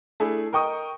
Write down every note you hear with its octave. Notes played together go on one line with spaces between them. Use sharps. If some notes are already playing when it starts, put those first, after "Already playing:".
A3 D4 E4 G#4
A#4 D#5 G5 C#6 D#6